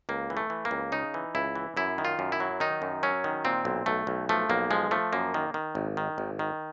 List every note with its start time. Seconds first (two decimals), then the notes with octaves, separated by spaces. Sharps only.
0.09 C#2 A#3
0.30 E3
0.37 A3
0.50 E3
0.65 A#3
0.71 C#2
0.92 C#3 D#4
1.14 E3
1.35 C#2 E4
1.55 E3
1.77 F#2 E4
1.98 D#3
2.05 F4
2.19 F#2
2.32 E4
2.40 F#3
2.60 D#3 D#4
2.82 F#2
3.03 F#3 C#4
3.24 D#3
3.45 A#2 C4
3.65 B1
3.86 B1 A3
4.07 B1
4.29 F3 A3
4.49 B1 A#3
4.71 F3 G#3
4.91 F3 A3
5.13 F#2 A#3
5.34 D#3
5.54 D#3
5.75 G#1
5.97 D#3
6.18 G#1
6.39 D#3